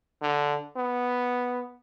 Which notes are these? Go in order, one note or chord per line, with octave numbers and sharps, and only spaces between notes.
D3
B3